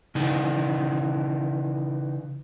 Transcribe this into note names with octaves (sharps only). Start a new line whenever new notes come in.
C#3 E3 D#4